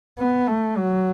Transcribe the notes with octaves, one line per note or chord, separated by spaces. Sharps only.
B3
A3
F#3